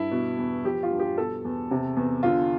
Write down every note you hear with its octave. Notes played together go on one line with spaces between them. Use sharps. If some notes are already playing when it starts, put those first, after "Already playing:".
Already playing: G2 E4
B2
E2
F3 G4
F4
G2
G4
B2 A4
E2
C3
E2
D3 F4